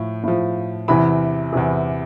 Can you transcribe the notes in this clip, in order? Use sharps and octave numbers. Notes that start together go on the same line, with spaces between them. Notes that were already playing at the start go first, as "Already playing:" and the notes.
Already playing: A2 F3
A2 F3
E2 C3 E3 B5
E2 C3 E3